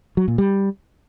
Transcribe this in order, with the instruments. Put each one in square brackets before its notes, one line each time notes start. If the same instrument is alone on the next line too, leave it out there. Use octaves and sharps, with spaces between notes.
[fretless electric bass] F#3
A#2
G3